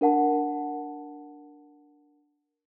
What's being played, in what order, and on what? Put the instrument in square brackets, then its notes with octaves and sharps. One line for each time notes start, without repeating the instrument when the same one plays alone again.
[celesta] D4 A#4 F#5 A5